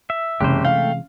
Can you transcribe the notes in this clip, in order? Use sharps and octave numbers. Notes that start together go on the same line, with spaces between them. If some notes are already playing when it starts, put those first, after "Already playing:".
E5
F#1 C3 E3 G#3 G4 C5
A3 F5 G5